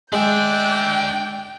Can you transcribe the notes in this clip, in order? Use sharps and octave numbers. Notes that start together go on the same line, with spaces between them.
G#3 D4 D5 E5 G5 F#6 G6